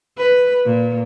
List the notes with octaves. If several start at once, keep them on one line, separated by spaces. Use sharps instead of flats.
B4
A#2